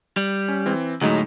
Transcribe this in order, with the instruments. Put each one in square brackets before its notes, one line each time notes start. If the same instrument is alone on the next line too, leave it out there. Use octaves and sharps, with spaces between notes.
[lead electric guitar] G3
[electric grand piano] C#4
E3 C4
[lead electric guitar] D2 A2 [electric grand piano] F#3 G#3 D#4